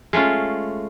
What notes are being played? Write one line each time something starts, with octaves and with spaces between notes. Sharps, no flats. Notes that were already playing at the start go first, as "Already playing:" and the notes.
G#3 A3 C#4 F4